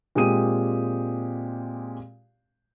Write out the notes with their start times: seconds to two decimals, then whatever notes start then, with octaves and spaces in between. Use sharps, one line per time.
0.15 A#2 G#3 C4 G4 D#6 D#7